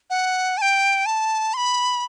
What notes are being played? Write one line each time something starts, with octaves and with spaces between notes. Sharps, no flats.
F#5
A5
G5
A5
C6
B5